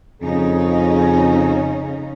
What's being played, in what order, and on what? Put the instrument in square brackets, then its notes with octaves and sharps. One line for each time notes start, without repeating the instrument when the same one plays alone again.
[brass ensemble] F2 G#4 [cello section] C#3 C#4 D#4